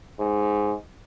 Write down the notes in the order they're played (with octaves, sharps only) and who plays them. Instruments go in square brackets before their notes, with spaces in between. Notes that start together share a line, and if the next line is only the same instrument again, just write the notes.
[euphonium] G#2